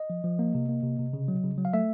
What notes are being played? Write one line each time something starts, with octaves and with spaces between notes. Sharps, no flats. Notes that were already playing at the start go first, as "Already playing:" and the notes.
Already playing: D#5
F3
F3
A#3
C3
A#3
C3
C3
C#3
F#3
C#3
F#3
F5
A3 E5